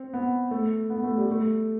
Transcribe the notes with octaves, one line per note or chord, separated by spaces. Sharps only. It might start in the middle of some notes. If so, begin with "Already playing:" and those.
Already playing: C4
B3
A3
B3
A3
G3
A3